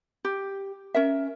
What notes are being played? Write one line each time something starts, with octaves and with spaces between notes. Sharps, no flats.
G4
C#4 A#4 E5